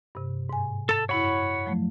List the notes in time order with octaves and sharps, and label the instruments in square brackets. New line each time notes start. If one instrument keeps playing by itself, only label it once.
[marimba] G2 C3
G#2 G#5
[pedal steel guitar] A4 A5
[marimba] F#2 E4 [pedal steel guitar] C#5 F#5 B5
[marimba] F3 F#3 A3